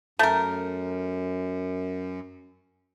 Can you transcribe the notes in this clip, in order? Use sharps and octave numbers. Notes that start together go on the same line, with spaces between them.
F#2 A3 A#4